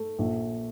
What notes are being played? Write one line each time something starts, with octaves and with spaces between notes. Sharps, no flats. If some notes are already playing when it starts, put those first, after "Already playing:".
Already playing: A3
A#1